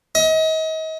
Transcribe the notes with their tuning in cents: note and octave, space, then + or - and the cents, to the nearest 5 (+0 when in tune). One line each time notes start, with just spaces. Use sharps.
D#5 +35